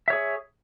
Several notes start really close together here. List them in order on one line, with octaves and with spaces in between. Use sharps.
E5 C#5 G#4